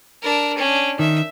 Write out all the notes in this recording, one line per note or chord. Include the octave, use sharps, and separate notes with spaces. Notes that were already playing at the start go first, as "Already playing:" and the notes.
D4 A#4
C#4 D4
D#3 E5